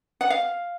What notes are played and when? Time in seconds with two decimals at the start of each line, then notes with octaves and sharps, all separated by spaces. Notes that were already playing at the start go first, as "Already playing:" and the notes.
0.21 F#5
0.30 F5